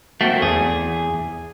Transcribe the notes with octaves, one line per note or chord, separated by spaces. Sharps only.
A3 A#3 C4 F#4
E2 G#4